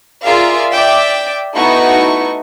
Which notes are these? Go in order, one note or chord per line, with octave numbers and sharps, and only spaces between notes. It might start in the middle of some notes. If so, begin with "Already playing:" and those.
F4 G#4 A#4 D5 E5 F5
D5 E5 G5 D6
A3 B3 D#4 E4 F#4 C#6